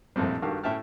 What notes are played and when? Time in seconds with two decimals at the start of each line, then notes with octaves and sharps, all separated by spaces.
0.16 A#1 F2 A2 C3 G3
0.42 G2 D#3 F#4 G4 A4 F5
0.63 A2 C#4 E5 G5 A5 F6